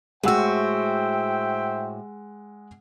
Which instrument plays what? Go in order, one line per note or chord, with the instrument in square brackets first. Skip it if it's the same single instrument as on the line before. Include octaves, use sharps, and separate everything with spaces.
[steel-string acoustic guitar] A2 F#4 [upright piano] G#3 F#5 E6 [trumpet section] C5 E5 G5